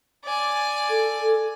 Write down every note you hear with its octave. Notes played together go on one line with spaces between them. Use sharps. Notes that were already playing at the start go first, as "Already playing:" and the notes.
D5 G#5
A4